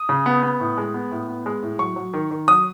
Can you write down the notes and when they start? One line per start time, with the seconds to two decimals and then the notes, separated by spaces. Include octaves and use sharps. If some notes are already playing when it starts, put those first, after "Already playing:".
Already playing: D#6
0.09 C#3
0.26 B3
0.43 B3
0.60 A2
0.78 G#3
0.94 B3
1.11 A2
1.28 B3
1.46 G#3
1.63 A2
1.79 F#3 C#6
1.96 F#3
2.13 D#3
2.31 D#3
2.48 F#3 D#6